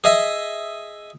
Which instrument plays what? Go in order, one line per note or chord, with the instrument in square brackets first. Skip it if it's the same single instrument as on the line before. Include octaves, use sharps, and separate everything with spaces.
[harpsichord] G#4 D#5 E5